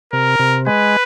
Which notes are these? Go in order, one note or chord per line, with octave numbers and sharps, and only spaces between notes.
C3 A#4
C3
G#3 B4